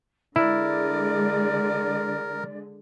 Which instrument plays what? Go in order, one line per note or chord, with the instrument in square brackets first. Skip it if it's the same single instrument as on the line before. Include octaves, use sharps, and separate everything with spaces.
[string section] D3 G#3 [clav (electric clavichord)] E4 [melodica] A#4 [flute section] D5